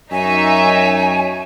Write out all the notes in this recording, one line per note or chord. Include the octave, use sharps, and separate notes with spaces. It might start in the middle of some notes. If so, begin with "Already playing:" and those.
F#2 D#4 C#5 E5 G#5